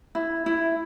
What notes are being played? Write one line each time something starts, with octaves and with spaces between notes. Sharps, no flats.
E4
E4